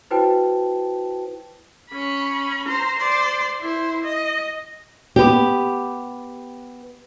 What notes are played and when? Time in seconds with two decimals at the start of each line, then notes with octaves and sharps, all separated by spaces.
0.11 E4 F#4 B4 C5 G5 A5
1.90 C#4 B5
2.66 C5 A#5
2.98 C5 D5
3.60 E4 C5
4.04 D#5
5.16 B3 G4